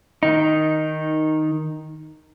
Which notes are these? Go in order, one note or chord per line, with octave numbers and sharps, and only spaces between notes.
D#3 D#4